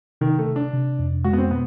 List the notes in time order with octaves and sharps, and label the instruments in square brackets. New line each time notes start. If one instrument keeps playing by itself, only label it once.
[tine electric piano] C3 [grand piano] D#3
[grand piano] A3
[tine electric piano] C3
[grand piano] D4
[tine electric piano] C3
F2
[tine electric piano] G#3 [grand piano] F#4
[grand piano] B3
C4
[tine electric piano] B2 [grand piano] B3